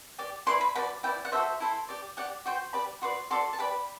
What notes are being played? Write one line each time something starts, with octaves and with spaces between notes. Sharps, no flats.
G4 D5
E4 B4 D5 C6
B5
F#4 B4 D5 B5
E4 B4 D5 G5
F#5
F#4 A4 C5 E5
E4 A4 C5
G4 D5
G4 D5 F#5
F#4 C5 G5
G4 B4 D5 B5
F#4 B4 D5 C6
F#4 A4 D5 C6
A5
G4 B4 D5 B5